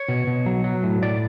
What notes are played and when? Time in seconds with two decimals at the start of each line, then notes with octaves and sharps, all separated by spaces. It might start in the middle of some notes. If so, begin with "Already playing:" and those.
Already playing: C#5
0.08 B2
0.27 B2
0.46 F#3
0.64 F#3
0.83 A2
1.02 A2 D5